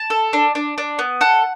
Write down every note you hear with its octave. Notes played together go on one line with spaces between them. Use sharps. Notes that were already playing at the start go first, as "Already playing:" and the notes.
Already playing: A5
A4
D4
D4
D4
B3
A4 F#5